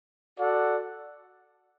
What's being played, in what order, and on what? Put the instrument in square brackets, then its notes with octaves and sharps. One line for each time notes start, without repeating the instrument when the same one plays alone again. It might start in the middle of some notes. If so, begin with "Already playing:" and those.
[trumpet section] F#4 A4 D5 F#5